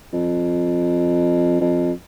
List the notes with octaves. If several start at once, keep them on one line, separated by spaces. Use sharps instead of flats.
F2
F2